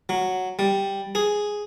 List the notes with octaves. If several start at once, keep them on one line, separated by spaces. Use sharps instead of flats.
F#3
G3
G#4